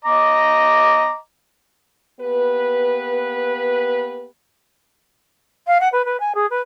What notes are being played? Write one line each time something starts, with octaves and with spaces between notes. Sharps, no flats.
D#5 A#5 D6
A#3 B3 G4 B4
F5
F#5
B4
B4
G#5
G#4
B4